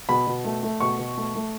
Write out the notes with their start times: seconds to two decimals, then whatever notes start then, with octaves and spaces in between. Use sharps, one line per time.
0.09 B2 B5
0.27 B2
0.45 A3
0.63 A3
0.80 B2 C#6
0.99 B2
1.18 A3
1.35 A3